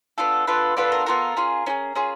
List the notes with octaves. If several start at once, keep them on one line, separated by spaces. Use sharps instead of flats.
B3 D4 F4 A4
B3 D4 F4 A4 B4
B3 D4 F4 A4 B4
A#4
B3 D4 F4 A4 A#4
C#4 F4 G#4
C#4 F4 G#4
C#4 F4 G#4